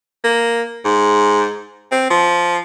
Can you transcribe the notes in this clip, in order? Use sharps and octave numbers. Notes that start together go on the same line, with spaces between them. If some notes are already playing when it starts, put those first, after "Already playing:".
A#3
G#2
C4
F3